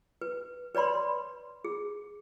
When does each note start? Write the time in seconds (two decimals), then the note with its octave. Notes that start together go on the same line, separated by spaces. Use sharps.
0.21 B4
0.75 B4 C#5 D5 B5 C6
1.65 G#4